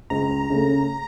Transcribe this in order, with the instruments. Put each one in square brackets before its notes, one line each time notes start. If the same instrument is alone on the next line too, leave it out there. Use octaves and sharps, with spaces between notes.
[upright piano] C#2 [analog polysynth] A#5
[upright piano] C#3 A3